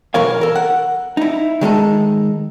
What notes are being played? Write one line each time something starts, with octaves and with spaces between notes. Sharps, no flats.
B1 E3 A#4 C#5 F5
A4 A#4
F#5
D#4 E4
D#3 G#3 D#4 A4